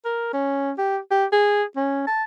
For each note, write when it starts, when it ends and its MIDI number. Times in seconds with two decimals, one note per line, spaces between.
0.05 0.32 70
0.33 0.72 61
0.78 0.98 67
1.11 1.25 67
1.32 1.63 68
1.76 2.06 61
2.07 2.24 81